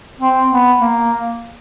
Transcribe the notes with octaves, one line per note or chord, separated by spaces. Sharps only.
C4
B3
A#3